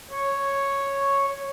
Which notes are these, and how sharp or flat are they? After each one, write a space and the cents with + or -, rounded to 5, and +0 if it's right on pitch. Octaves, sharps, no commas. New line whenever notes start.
C#5 -5